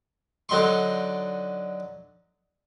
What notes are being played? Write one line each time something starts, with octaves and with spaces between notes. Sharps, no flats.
D3 F#3 D#4 C6 C#6